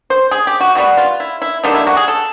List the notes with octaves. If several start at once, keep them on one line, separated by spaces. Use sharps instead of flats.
C5
G#4
G4
F#4
E3 G3 B3 F#4
F4
E4
E4
D3 G3 A#3 D#4
E4
F#4
G#4
A4